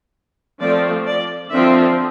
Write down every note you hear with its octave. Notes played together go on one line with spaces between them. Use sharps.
F3 A3 C4 D5
D5
D3 F3 C4 E5